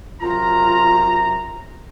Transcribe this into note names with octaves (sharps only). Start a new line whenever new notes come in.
F#2 C3 F4 A#5